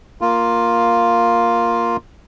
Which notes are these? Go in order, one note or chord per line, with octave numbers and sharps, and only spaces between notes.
A#3 F4